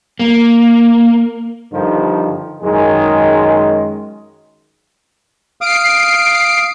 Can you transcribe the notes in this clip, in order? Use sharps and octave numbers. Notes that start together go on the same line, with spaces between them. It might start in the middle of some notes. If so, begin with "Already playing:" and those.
A#3
G2 D3 D#3 F3
F#2 D#3 G#3
F5 D#6 C7 D7